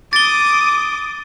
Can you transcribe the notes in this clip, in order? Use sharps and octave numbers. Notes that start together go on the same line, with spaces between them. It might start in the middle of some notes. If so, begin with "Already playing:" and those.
D6 D#6 A6 G7